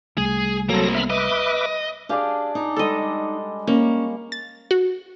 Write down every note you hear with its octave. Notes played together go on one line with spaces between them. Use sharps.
C2 G3 A3 G#4
F#3 A#3 C4 A4 A#6
E5 B5 F6
B4 D#5 E5 D6
D4 G4 G#4 D5 F5
D#4
G3 G#3 A4 D#5
A#3 C#4
A6
F#4